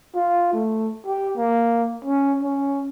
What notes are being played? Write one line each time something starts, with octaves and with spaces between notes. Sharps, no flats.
F4
A3
G4
A#3
C#4
C#4